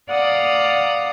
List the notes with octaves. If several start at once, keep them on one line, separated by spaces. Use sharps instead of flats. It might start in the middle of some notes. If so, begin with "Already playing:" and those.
D5 F5 F#5 A#5 D#6